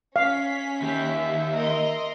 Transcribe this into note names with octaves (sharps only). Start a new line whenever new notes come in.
C#4 F5 B6
D#2 G4 E5
A#4 D#5 C6